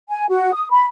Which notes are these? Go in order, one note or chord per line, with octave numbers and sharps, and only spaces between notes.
G#5
F#4
D#6
B5